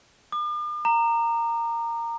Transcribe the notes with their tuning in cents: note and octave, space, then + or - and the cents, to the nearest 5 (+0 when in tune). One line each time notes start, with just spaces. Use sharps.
D6 +45
A#5 -10